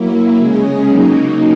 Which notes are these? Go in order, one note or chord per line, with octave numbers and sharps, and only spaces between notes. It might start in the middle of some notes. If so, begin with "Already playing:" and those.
Already playing: F#3 A#3 E4
C#3 G#3 C#4 G#4
C#3 F#3 A#3 D#4